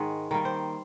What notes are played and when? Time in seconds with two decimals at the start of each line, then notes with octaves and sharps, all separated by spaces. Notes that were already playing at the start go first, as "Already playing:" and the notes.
Already playing: G#2 D#3 G#3
0.31 D#3 G3 A#3 D5
0.45 C5